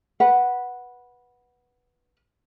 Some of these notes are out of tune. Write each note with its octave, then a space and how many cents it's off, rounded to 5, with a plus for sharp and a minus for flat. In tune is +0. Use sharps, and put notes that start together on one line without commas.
B4 -10 F#5 +0